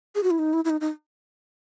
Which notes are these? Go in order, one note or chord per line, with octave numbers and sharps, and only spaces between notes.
G#4
F#4
E4
D#4
E4
E4
D#4
D#4